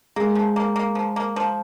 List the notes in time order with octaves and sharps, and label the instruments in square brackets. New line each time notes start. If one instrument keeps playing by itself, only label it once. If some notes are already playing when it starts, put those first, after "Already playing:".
[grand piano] G#3 [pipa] A#3
[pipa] F3
A#3
A#3
F3
A#3
F3